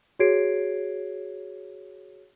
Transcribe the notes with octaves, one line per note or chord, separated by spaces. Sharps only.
F#4 G#4 C#5 G#6 C7 D7